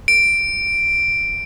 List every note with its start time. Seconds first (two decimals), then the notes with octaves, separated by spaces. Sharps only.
0.08 D7